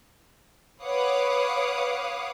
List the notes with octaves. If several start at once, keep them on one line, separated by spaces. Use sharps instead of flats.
B4 C#5 F5 F#5 D6 D#6